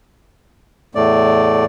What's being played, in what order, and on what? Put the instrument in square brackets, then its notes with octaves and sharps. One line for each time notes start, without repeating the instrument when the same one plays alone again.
[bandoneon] E2 A2 A3 D5